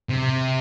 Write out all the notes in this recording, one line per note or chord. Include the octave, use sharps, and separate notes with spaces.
C3